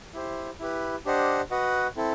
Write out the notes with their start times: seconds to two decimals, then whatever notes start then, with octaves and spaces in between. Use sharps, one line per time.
0.14 E4 G4 C5
0.59 E4 G4 B4
1.05 D4 G4 C5 D#5 F#5
1.51 F#4 B4 D#5 F#5
1.96 C4 E4 A4